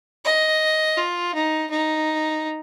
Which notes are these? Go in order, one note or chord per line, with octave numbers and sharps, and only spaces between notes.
D#5
F4
D#4
D#4